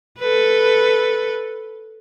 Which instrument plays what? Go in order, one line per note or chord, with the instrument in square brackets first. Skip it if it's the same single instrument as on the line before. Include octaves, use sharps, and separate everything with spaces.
[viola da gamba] A4 B4